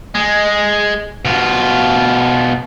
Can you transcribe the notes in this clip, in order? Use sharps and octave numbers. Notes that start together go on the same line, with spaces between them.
G#3
B2 F4